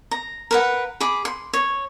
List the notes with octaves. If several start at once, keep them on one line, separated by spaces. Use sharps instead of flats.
A#5
A#4 B4 F#5
G#4 B5 D6
C6
C#5